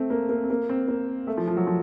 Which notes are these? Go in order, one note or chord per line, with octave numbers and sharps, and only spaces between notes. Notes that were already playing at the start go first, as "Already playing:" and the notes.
Already playing: A3 C4
A#3
A#3
C4
A#3
C4
A#3
A3
F3
F3
F#3
F3